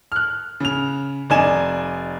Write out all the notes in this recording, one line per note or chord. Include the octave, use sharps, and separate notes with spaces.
F6 F#6
C#3 F7
F1 D#4 D5 G#5 E7